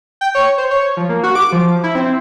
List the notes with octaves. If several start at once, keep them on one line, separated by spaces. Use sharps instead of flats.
G5
C#5
C5
C#5
F3
A#3
F#4
D6
F3
E4
C4